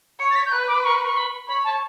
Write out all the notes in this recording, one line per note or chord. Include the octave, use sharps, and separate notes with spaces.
C#5 C#7
A6
B6
G6
B4 F#6
D6
C#6
C#6
B5
C#5 B5
A5